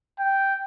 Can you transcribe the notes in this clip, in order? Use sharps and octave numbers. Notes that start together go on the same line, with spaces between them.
G5